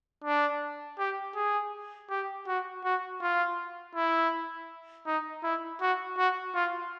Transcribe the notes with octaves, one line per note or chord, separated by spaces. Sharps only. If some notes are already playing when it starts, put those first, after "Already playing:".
D4
G4
G#4
G4
F#4
F#4
F4
E4
D#4
E4
F#4
F#4
F4